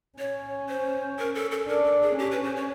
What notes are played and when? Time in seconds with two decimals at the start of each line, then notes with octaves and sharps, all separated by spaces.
0.18 C#4 C#5
0.69 C5
1.19 A#4
1.35 A4
1.52 A4
1.68 D4 A#4
1.85 A4
2.02 G#4
2.19 C#4 G4
2.31 B4
2.44 C5
2.56 C#5